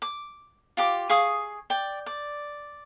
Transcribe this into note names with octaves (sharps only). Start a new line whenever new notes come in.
D6
F4 G4 D6
G#4 F5 C#6 D#6
D5 G5
D5